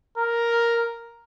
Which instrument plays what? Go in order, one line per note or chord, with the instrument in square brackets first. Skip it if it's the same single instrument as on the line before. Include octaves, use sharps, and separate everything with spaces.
[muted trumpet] A#4